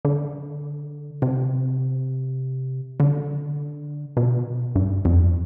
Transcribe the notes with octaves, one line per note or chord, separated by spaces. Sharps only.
D3
C3
D3
B2
G2
F2